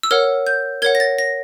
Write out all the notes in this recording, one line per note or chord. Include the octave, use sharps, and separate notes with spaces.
E6
A#4 C#5 F#5 F6
G6
A#4 C#5 F#5 G#6
A#6
A6
A#6